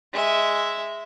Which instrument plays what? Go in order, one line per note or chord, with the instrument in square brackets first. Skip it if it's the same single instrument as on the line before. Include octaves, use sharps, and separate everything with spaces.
[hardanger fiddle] G#3 E5